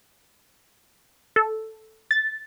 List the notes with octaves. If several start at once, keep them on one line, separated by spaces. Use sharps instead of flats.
A4
A6